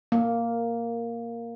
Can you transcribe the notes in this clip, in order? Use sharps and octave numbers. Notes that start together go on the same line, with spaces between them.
A#3